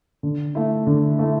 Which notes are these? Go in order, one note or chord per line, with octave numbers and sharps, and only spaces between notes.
D3
A3 E4
D3
A3 E4